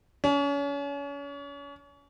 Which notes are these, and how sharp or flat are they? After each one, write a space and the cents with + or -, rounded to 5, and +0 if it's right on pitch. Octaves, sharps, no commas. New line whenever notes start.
C#4 +35